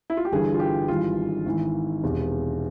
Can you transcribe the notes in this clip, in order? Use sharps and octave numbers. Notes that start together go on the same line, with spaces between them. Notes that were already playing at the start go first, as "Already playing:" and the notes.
E4
F4
G4
G1 G2 E3 G#4
F4
G4
G#1 G2 E3 F4
G#1 G#2 E3
E1 E2 C3